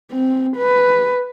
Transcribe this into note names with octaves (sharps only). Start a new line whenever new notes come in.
C4
B4